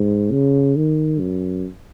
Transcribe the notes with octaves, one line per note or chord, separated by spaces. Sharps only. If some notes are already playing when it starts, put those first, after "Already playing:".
Already playing: G#2
C#3
D#3
F#2